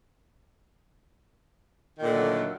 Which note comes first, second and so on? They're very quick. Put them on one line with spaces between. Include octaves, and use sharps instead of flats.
D#3 A#2 D3 A3 F#3